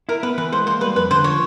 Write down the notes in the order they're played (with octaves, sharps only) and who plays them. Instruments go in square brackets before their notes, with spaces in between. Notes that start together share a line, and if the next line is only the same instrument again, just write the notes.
[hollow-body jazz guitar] E4 [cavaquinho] A#4
[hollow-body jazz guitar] B3 [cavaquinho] B4
[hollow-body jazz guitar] E3 [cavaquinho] B4
[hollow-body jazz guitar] G#3 [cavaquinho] C5
[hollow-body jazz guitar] A#3 [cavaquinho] C5
[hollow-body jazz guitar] G3 [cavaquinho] B4
[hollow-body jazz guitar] F2 [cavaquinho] B4
[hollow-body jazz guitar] D3 [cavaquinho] C5
[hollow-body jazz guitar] F3 [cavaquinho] C#5